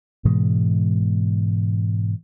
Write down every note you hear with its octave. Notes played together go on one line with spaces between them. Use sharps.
G#2 B2 E3 G#3